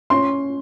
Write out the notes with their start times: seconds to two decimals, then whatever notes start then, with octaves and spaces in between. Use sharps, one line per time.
0.10 C#4 C6